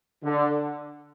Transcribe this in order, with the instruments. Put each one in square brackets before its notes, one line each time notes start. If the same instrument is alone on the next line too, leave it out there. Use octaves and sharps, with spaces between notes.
[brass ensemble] D3